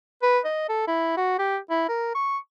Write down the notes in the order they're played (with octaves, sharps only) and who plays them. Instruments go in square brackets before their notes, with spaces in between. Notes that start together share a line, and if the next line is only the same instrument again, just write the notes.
[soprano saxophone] B4
D#5
A4
E4
F#4
G4
E4
A#4
C#6